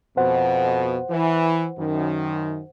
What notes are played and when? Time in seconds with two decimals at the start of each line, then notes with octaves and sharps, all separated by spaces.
0.17 F2 B2 C5 F#5
1.10 E3
1.78 F#2 D#3